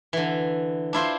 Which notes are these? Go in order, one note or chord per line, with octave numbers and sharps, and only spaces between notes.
D3 E3
D4 E4 F4 C5